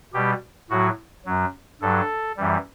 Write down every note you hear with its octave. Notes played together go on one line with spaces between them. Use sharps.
B2 G3 G4
A2 F#3 F#4
F#2 F#3
G2 F#3 A4
F#2 E3 G3